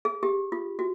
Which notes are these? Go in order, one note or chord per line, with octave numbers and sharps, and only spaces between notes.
G#4
G4
F4
F#4